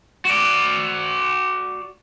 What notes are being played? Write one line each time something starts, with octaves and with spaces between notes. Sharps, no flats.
F#4 D5